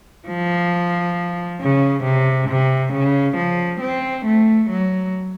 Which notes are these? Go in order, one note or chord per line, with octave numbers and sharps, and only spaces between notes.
F3
C#3
C3
C3
C#3
F3
C4
A3
F#3